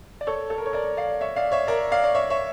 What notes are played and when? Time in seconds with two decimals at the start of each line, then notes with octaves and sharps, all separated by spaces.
0.21 D5
0.27 A4 C#5
0.50 A4
0.58 A#4
0.66 C#5
0.73 A#4 D5
0.97 D5 F5
1.21 C#5 E5
1.36 D5 F5
1.52 C#5 E5
1.67 A#4 D5
1.92 D5 F5
2.04 D5
2.15 C#5 E5
2.30 C#5 E5